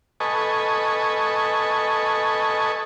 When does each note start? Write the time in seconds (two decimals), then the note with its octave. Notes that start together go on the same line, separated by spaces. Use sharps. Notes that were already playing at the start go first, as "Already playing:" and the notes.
0.20 A4 B4 D#5 G#5 C#6